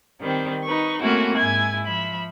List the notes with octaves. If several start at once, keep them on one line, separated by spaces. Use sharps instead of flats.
D#3 G3 C4
D#4 B4 C#6
A3 A#3 C4 C#4 E4 F#4
G#2 E4 G#5 G#6
F3 E5 B5